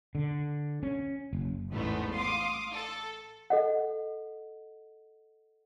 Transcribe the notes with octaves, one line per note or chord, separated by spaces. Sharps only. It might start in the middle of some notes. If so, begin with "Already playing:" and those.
D3
C#4
F#1
A1 E2 G#2 A3 B3
F5 C6 D6 D#6
A4
A4 D#5 F#5